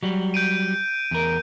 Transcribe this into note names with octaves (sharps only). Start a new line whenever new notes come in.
F#3 G3
G6 D7 D#7
E2 A#4